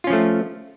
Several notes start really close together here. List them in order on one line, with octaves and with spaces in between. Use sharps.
F4 C#4 F3 A3